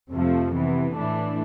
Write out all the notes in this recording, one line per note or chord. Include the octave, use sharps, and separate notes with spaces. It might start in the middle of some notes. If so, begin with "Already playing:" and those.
F2 C3 F3 A3
C3 E3 B3
A2 E3 A3 D4